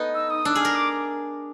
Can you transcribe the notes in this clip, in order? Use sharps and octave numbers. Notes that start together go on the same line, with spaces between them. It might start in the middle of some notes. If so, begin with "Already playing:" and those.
Already playing: A3 B3 D#4
E6
D#6
D4 E6
G#4
A#4 F6
D6